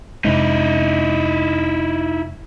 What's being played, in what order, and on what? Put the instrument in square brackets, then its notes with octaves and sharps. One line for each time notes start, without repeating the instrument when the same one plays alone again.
[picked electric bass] F2 C3 G#3 [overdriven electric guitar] D#4 E4